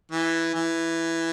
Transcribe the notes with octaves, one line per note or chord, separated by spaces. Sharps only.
E3
E3